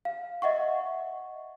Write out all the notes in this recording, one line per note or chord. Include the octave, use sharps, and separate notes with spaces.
F5
D#5 E5 F#5 C#6